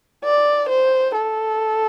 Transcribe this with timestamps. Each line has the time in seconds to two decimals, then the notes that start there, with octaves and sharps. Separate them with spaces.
0.24 D5
0.69 C5
1.15 A4